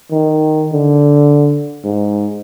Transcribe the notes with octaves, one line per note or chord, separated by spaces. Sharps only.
D#3
D3
G#2